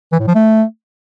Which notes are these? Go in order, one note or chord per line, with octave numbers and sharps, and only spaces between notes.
E3
A2
F3
A3